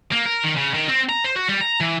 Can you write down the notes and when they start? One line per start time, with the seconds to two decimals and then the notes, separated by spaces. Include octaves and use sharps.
0.12 A#3
0.25 A#4
0.43 D#3
0.56 C#3
0.74 D#3
0.88 C4
1.09 A#5
1.25 C5
1.36 F#4
1.49 G3
1.61 A#5
1.81 E3